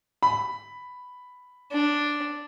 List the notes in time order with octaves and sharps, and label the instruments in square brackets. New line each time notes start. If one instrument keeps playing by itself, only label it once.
[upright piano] B5
[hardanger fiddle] D4